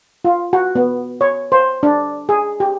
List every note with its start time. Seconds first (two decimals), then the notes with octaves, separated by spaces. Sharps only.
0.25 F4
0.53 F#4
0.75 B3
1.21 C#5
1.52 C5
1.83 D4
2.29 G#4
2.60 G4